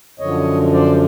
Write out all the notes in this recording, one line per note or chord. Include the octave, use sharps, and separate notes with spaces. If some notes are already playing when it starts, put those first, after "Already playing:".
F#2 D3 F3 C#5 D#5
C5 D5